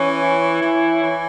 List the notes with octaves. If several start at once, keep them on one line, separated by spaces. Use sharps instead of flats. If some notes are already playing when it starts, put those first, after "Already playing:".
Already playing: E3 C#4 C#5
E4
E3
E3 C#5